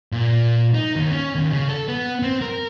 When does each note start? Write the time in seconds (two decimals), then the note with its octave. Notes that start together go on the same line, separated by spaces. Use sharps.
0.12 A#2
0.75 D#4
0.96 D#2
1.12 C#4
1.35 D#2
1.52 C#3
1.69 A4
1.88 B3
2.22 C4
2.41 A#4